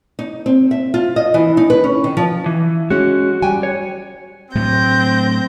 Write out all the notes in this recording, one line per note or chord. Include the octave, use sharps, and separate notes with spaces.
D#4
C4
E5
F4
D#5
E3
D#4
B4
C#4
D#3
F3
E3
G#3 C#4 F#4
G3 G5 G#5
C#5
A2 F#3 A3 C4 G6 A#6